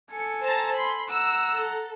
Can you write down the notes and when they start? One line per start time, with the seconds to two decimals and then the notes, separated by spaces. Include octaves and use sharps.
0.12 A4 G#5 C#7
0.42 C5 A5 A#5
0.78 B5 C6
1.10 F#5 A#5 E6
1.51 A4